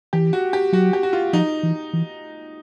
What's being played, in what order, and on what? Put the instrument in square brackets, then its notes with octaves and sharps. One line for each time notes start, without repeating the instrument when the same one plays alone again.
[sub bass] E3 [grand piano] G4
[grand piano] F#4
G4
[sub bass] F#3 [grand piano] F#4
[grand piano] G4
F#4
F4
[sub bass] F3 [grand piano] D#4
[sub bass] E3
E3